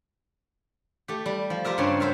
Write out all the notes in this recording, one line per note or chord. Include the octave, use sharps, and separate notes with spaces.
A3 G4
G3
F3
F4 G4 A#4 E5
G2 C#3 C4 C#4 C#5 C6
F#2 C5 E5 F5